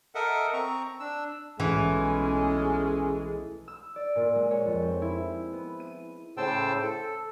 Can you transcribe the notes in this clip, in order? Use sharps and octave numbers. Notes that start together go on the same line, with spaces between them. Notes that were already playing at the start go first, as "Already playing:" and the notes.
A4 A#4 D#5 E5 F#5
C4 A#5 C#6
D4 E6
B1 E3 G#3 A3 C#4
E6
D5
A#2
G#3
C#5
F2
C4
E4
B3
D#7
A2 C#3 C5 G5 A5 E6
A4